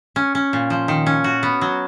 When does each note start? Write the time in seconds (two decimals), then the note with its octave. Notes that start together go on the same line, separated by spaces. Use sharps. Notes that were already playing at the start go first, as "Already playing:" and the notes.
0.16 C#4
0.35 C#4
0.53 A#2
0.70 F3
0.88 D#3
1.06 C#4
1.24 F#4
1.43 B3
1.61 F#3